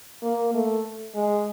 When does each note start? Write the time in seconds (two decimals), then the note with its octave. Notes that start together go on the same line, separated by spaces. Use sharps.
0.22 A#3
0.54 A3
1.15 G#3